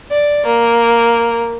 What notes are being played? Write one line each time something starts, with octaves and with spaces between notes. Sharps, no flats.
D5
A#3